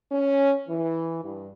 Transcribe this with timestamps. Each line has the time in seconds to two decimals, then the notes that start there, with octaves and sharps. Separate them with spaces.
0.10 C#4
0.67 E3
1.22 G2